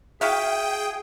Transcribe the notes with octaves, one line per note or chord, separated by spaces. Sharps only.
E4 F#4 G#4 E5 F5 G5